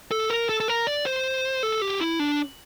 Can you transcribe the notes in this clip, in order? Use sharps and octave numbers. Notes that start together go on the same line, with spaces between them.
A4
A#4
A4
A4
A#4
D5
C5
A4
G4
E4
D4